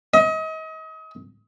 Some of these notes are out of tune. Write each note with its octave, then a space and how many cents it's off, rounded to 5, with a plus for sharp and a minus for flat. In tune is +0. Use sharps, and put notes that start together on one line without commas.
D#5 +35